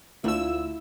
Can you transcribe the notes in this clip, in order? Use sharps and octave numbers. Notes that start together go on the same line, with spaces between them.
D2 E4 F4 E6